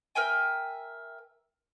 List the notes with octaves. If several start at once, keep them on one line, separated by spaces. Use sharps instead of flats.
A#4 E5 G5 G#5